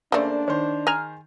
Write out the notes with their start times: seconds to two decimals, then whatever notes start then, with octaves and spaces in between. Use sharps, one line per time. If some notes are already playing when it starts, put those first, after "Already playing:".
0.12 C#3 A3 A#3 D4 C5 D5
0.48 D#3 C5 C#5
0.87 G#4 A#5 F6